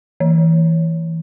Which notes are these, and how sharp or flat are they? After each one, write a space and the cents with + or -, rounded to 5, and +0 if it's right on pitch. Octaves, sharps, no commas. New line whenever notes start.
E3 -10